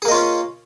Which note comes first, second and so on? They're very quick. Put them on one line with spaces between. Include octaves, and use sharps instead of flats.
G#4 A#3 D#5 F4 C#4